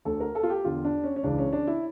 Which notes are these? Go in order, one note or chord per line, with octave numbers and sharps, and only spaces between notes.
D2 D3 A4
A#4
A4
F4
G4
E2 D3 F4
D4
C#4
C#4
C#2 C#3 E3 D4
C#4
D4
E4